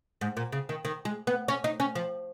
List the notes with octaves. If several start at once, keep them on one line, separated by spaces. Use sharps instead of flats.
G#2
A#2
C#3
D#3
D#3
G#3
B3
C#4
D#4
C#4
F3